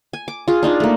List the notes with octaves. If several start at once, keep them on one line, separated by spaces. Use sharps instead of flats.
G#5
D6
F4 G#4
D4 D#4 F4
A3 A#3